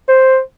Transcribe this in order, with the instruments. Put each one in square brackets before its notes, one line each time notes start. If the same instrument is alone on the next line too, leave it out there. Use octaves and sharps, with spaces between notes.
[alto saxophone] C5